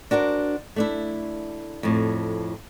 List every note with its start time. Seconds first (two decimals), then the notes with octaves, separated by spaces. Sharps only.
0.11 D4 F#4 A#4 C5
0.76 A3 D4 E4
1.83 F2 A2